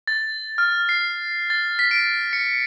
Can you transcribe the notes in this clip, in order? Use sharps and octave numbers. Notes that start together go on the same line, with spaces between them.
A6
F6
C7
A6
B6
D7
C#7